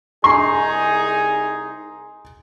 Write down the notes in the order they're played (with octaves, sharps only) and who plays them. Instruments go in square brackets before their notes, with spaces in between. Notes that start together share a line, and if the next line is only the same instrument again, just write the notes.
[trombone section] C2 D#4 G#4 [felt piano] G#5 A#5 C6